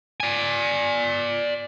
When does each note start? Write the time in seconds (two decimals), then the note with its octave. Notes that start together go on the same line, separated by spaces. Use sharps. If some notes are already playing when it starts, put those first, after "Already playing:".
0.20 D5 G#5